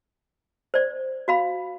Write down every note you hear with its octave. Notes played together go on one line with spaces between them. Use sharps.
C5 D5
F#4 F5 B5